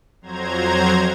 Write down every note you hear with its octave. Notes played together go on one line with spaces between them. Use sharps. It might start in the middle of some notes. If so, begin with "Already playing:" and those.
F2 F#3 C5 A#5 G#6